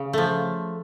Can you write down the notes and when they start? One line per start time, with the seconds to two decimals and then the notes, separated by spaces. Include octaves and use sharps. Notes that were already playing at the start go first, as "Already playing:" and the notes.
Already playing: C#3
0.13 F3 A3